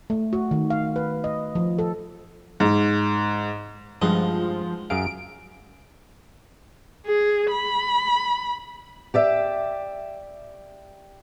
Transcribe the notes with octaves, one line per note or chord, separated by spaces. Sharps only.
A3
F#4
D#3
F5
B4
D#5
F3
A4
G#2
G2 F3 G#3 D#4 F#5
F#2 G#4 F5 D7
G#4
B5
G4 D5 E5